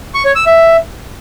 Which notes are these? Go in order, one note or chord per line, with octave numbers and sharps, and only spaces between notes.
C#6
C#5
E6
E5